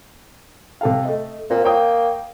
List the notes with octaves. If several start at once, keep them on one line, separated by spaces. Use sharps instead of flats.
C3 A4 F5
A3 D#5
A#2 C4
A#3 C#5 G5 D#6